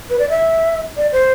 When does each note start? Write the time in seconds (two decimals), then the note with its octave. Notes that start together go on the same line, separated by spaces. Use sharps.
0.10 B4
0.19 D5
0.30 E5
0.97 D5
1.12 C5